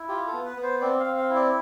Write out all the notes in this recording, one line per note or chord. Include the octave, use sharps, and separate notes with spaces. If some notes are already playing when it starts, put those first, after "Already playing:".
Already playing: E4
F4 G4
A4
B3
B4
B3
C5
C4 D5
F5
C4
F5
E4
D5